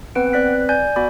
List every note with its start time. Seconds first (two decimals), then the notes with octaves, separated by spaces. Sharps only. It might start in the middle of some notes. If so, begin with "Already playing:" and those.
0.15 B3 C4 B4 F#5 D7
0.33 C4 B4 D5 F#6 B6
0.69 D5 G#5 G6
0.96 B3 F#4 D5 B5 D6